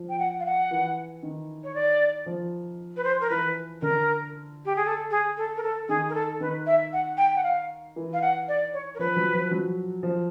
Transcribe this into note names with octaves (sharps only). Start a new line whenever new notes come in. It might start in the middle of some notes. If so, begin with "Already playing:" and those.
Already playing: F3
G5
F#5
F5
F#5
E3
D#3
C#5
D5
F3
B4
C5
A#4
E3 B4
D3 A#4
G4
G#4
A4
G#4
A4
A#4
A4
D#3 G#4
A#4
A4
D#3 B4
E5
F#5
G5
F#5
F5
E3
F5
F#5
D5
C#5
A#4
F3 B4
F#3
F3
F#3
F3